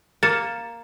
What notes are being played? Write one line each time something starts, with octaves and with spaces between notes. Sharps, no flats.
A#3 A6 C#7 E7